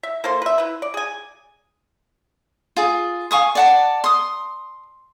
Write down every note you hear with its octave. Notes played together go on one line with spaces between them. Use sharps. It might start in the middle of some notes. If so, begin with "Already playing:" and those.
E5
A#3 A4 C5 C6
B4 E5
E4 B4
D5
G#4 G#5
F4 G#4
F5 G#5 C#6 D#6
D5 F#5 A5
C6 D#6